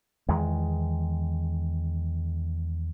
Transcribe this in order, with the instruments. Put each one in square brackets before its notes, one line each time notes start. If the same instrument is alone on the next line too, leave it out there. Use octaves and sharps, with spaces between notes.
[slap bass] E2 D#3 G#3